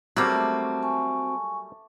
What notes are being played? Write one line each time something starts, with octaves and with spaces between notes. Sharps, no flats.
F#3 G3 A3 A#3 C4 F#4 D6
G#5 C#6